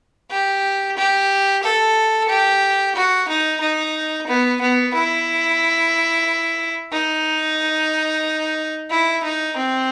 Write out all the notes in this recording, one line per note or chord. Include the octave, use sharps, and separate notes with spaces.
G4
G4
A4
G4
F#4
D#4
D#4
B3
B3
E4
D#4
E4
D#4
C4